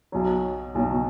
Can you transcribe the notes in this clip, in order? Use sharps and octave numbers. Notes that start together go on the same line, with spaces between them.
B1 B2 F#3
B1 B2 F#3